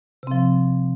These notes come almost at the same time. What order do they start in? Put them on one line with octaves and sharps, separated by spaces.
C3 C4 F3